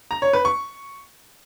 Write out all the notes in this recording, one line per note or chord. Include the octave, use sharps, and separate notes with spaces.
A#5
C#5
B4
C#6